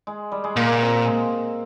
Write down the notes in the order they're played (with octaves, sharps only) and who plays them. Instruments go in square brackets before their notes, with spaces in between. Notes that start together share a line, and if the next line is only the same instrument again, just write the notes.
[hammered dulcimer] G#3
G3
G#3
[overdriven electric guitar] A#2 [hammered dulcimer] A#3
[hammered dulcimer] C4
G#3